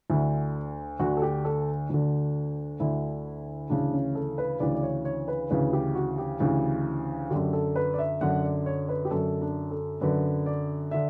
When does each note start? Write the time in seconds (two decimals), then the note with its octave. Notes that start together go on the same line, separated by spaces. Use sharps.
0.10 D2 D3 E4
0.99 D2 D3 F#4
1.17 A4
1.22 G4
1.45 A4
1.90 D2 D3
2.80 D2 D3 E4
3.70 D2 C#3 E3 D4
3.93 C#4
4.15 A4
4.38 B4
4.60 D2 C#3 E3 D5
4.75 D5
4.83 C#5
5.05 C#5
5.28 B4
5.50 D2 C#3 E3 B4
5.73 G4
5.95 F#4
6.18 G4
6.40 D2 C#3 E3
7.31 F#2 D3 G4
7.53 A4
7.75 B4
7.94 D5
7.99 E5
8.21 F#2 D3 F#5
8.44 D5
8.66 C#5
8.89 B4
9.05 G4
9.11 F#2 D3 A4
9.41 D4
9.71 A4
10.01 F#2 D3 B4
10.46 D5
10.91 D3 E5